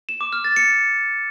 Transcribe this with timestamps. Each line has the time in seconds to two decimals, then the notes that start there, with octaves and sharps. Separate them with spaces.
0.09 E7
0.21 D6
0.33 F6
0.44 A6
0.56 C#7